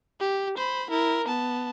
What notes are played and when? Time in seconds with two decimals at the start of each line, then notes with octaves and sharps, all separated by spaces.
0.20 G4
0.58 C5 B5
0.90 E4 A#4
1.27 B3 A5